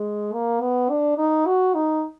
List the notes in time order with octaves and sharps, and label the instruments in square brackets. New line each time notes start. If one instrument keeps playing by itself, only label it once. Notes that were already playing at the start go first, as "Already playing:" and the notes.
Already playing: [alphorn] G#3
A#3
B3
D4
D#4
F#4
D#4